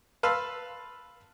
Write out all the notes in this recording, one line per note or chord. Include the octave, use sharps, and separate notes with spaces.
B4 F5 A5 C6 E6